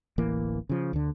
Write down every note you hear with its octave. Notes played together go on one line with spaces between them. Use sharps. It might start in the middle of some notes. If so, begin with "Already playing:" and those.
D1 A1 E3 A#3
C#3 F3
D2 D3